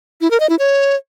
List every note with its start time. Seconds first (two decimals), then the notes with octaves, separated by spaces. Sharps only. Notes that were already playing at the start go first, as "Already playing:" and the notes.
0.21 E4
0.31 A#4
0.40 D#5
0.50 E4
0.59 C#5